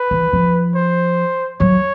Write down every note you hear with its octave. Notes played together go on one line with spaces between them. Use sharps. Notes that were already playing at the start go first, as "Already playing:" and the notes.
Already playing: B4
E3
F3
C5
F#3 C#5